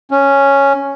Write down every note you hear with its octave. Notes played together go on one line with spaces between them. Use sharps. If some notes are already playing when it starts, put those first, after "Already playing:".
C#4